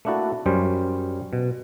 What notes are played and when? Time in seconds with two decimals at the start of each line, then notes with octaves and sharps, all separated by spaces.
0.05 A3 A#3 D4 E4 F#4 A4
0.46 F#2 G3 C#4 C5 C#5
1.33 B2